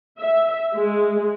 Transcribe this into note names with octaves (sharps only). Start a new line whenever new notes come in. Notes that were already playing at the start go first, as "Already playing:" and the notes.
E5
G#3